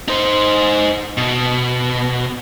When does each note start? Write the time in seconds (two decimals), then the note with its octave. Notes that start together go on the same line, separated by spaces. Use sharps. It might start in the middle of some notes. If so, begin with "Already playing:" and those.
0.08 D#4 C5
1.17 B2